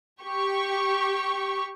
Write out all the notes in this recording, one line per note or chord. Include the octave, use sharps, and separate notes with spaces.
G4 C#6